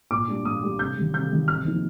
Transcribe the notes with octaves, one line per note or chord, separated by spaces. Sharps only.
A#2 D6
G3 D4
A#2 D#6
G3 D4
C3 G6
D#3 G3
C3 G6
D#3 G3
C3 F6
F3 A#3 D#4